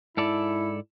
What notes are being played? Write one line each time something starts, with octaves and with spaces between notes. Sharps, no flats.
G#2 E4 A4 D5